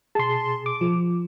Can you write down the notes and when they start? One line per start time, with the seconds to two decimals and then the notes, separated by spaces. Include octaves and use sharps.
0.15 B2 G#4 A5 C6
0.66 D6
0.81 F3